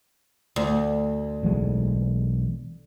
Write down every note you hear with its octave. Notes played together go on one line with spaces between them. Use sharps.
D2
B1 E3 G#3